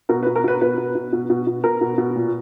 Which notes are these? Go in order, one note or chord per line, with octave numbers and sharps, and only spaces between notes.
B2 A#4
B4
B2
A#4
B2 B4
B2 B4
B2
B2
B2
B2
B2
B2 A#4
B2
B2
A#2